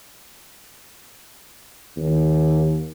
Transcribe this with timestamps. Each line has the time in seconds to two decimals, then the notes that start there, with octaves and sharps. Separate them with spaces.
1.97 D#2